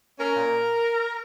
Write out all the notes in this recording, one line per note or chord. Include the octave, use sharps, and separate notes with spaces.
C#4 A#4
A#2